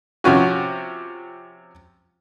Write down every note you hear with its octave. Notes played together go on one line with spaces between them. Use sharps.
C3 F3 C#4 F#4